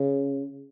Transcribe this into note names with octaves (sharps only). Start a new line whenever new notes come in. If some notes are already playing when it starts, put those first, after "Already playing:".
Already playing: C#3